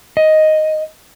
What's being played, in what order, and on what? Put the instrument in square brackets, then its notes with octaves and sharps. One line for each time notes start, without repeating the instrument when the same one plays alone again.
[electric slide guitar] D#5